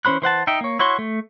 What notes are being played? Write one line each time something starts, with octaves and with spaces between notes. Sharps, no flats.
E3 C#4 C5 B5 F#6
E3 C5 F#5 A5
D#4 E5 G5
A#3 C#5
E4 F#4 C#5 C6
A3